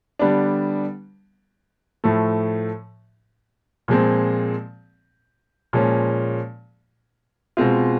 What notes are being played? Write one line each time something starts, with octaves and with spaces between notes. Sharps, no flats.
D3 G3 B3 D4
A2 F3 A3
A#2 F3 G#3 C4
A#2 F3 G#3 C#4
B2 G#3 C4 F4